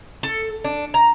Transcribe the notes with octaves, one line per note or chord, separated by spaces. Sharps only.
A4
D4
A#5